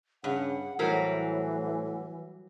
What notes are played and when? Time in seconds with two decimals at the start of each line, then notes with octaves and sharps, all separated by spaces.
0.24 G2 C#3 F#5
0.79 A2 E3 F#3 G3 A#4 C5 C#5 F#5